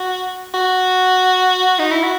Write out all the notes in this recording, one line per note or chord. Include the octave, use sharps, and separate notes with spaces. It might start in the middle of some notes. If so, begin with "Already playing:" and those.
Already playing: F#4
F#4
D#4
E4
F#4